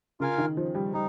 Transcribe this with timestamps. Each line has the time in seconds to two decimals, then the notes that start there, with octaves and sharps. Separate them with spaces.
0.20 C#3 F4 A#4 F5 G#5
0.38 D#3
0.57 F3
0.75 G3
0.93 G3 D#4